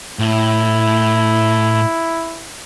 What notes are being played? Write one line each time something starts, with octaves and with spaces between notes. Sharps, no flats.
A2 E4